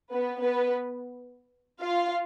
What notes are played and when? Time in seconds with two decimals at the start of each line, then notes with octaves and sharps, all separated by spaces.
0.13 B3 B4
0.41 B3 B4
1.82 F4 F5